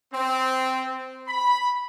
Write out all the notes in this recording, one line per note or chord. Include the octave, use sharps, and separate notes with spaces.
C4
B5